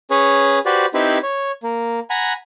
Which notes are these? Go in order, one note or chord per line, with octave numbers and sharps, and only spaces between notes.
C#4 G#4 B4 C#5
F#4 G4 B4 C5 D5
C4 D#4 E4 G4 B4 C5
C#5
A#3
F#5 G#5 A#5 B5 F#6